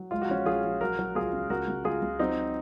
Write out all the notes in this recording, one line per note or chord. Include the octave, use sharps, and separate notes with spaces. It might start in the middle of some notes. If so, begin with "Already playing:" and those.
Already playing: F#3
G#3 F4
F#4
A#1 C#4 F4
A#1 F4 G#4
A#1
F#3 F#4 A#4
F#3
C#2 F4 G#4
C#3
C#2 F#4 A#4
C#2
C#2 F4 G#4
C#2
F#3 C4 D#4